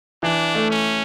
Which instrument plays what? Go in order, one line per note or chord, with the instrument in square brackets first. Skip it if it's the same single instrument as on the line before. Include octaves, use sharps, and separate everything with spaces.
[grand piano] E3 [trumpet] D4
[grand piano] A3
[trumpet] C#4